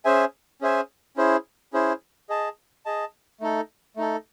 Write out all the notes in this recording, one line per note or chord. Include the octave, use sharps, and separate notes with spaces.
C#4 G#4 C5 E5 G#5
C#4 G#4 C5 E5 G#5
C#4 E4 G#4 C5
C#4 E4 G#4 C5
G#4 D#5 A5
G#4 D#5 A5
A3 D#4 A4
A3 D#4 A4